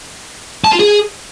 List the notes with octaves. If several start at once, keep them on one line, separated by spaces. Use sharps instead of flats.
A5
F4
G#4